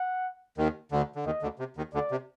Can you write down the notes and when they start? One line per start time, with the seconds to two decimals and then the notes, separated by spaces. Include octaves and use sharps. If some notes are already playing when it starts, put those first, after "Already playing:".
Already playing: F#5
0.58 D#2 D#3
0.91 D2 D3
1.15 D3
1.25 D#2 D#3 D#5
1.42 D2 D3
1.59 C3
1.77 D#2 D#3
1.93 D2 D3 D5
2.11 C3